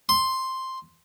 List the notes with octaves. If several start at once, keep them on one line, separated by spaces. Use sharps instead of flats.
C6